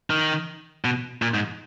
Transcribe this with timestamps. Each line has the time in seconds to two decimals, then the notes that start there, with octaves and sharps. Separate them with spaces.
0.10 D#3
0.85 B2
1.22 A#2
1.34 G#2